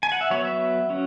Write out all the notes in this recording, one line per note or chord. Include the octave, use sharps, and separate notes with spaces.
G#5
F#5
E5
F#3 B3 C#5
E5
F#3 C#4